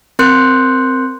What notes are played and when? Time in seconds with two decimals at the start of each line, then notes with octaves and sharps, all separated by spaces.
0.19 C4 A#4 C6 F#6 G6 C#7